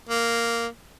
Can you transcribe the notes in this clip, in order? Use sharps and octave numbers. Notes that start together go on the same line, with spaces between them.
A#3